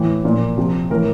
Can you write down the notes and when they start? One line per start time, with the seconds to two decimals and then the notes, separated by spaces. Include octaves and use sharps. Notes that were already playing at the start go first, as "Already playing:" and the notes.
Already playing: A2 E3
0.24 A#2 F3
0.57 C3 F3
0.90 A2 E3 A#4